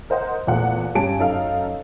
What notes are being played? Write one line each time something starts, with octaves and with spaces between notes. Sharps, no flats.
A#4 C5 D#5 F#5
A#1 E2 A#2 A3 F#5
G2 C#4 G4 G#5 A5 D7
F#2 D#4 A4 F5